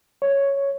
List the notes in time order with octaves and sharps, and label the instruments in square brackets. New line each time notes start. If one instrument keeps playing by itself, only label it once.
[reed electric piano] C#5